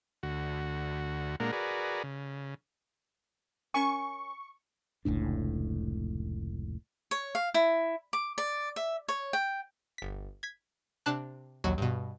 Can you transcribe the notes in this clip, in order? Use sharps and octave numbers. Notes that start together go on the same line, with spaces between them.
D2 F#4
A#2 G#3 A#3 D4 A#4 F#5
F#4 G#4 A#4 B4 D5
C#3
C#4 A#4 G#5 C#6
F1 C#2 A2 D4
C#5
F5
E4
D6
D5
E5
C#5
G5
G1 B6
G#6 B6
C3 D4 A5 F#6
A#1 D#2 F#3
G2 B2